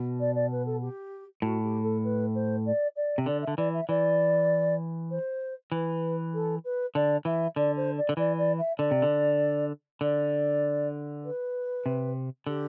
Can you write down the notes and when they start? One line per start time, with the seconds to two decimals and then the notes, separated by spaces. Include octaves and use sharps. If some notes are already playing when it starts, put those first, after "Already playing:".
Already playing: B2
0.20 D5
0.35 D5
0.51 B4
0.66 A4
0.81 G4
1.42 A2 F#4
1.63 G4
1.83 A4
2.04 B4
2.34 C5
2.66 D5
2.96 D5
3.18 C3
3.26 D3 D5
3.42 E5
3.47 D3
3.57 E3 D5
3.73 E5
3.89 E3 D5
5.11 C5
5.72 E3 B4
6.34 A4
6.64 B4
6.95 D3 D5
7.25 E3 E5
7.56 D3 D5
7.76 C5
7.97 D5
8.09 D3
8.17 E3 D5
8.38 D5
8.58 E5
8.78 D3 D5
8.91 C3
9.02 D3
10.01 D3 D5
11.24 B4
11.86 C3
12.47 D3 G4